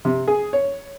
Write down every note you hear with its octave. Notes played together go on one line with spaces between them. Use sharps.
C3
G#4
C#5